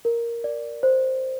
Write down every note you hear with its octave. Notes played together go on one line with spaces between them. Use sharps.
A#4
D5
C5